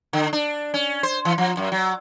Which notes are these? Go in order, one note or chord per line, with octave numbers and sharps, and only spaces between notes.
D3
D4
C#4
C5
E3
F3
F#2
F#3